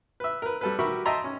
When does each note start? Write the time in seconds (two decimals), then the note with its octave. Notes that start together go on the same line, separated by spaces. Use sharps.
0.20 B4 E5
0.42 A#4 B4
0.61 G3 A4 B4
0.79 F#4 G4 A#4 E5 B5 C#6
1.06 D#5 E5 G5 A5 A#5 C6
1.24 C#4